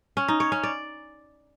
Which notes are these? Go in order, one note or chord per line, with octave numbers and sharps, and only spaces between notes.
C#4
D#4
C#5
C#4
D5